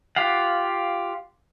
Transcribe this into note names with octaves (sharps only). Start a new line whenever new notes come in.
F4 G4 F5 F#5